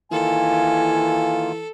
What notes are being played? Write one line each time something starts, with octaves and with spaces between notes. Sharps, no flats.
D#3 E3 A#3 F4 A4 G#5